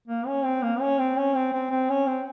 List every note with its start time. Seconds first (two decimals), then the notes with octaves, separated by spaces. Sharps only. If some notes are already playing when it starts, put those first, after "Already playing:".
0.08 A#3
0.27 C#4
0.44 C4
0.62 A#3
0.80 C#4
0.99 C4
1.17 C#4
1.35 C4
1.52 C4
1.70 C4
1.90 C#4
2.07 C4